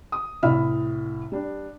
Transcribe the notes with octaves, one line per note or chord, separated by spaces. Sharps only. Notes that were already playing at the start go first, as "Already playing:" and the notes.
D#6
C2 A2 E5 B5 F6
G3 D4